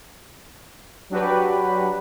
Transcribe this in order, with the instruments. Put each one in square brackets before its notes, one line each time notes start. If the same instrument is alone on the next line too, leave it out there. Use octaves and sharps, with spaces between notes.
[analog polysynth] F#3 D4 F#4 G4 B4